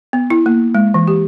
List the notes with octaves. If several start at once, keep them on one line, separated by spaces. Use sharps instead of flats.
B3
E4
A#3
G#3
E3
G4